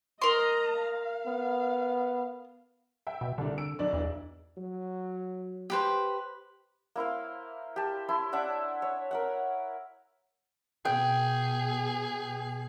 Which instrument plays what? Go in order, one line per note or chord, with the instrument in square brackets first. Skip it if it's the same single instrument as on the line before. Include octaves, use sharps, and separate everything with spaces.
[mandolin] A#4 C6 [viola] D#5 A#5
[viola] F5
[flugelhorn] B3
[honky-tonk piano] E5 G5
[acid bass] B2
[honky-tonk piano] C2 D4 [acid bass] D3
[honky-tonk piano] E6 D7
B1 D4 D5
[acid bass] E2
[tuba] F#3
[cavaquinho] G4 B4 C5
[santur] A#3 E4 C5 F5
G4 A5
E4 A5 C6
D4 E5 F#5 D6
C#5
A#4 E5 F#5
[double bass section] B2 [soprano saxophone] G#4 [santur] G5